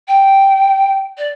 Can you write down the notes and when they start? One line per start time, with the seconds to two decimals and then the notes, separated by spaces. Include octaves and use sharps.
0.08 G5
1.17 D5